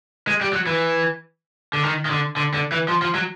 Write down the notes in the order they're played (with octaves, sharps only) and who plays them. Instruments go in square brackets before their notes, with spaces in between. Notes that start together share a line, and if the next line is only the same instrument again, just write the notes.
[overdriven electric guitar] G#3
G3
F#3
E3
D3
D#3
D#3
D3
D3
D3
E3
F3
F3
F#3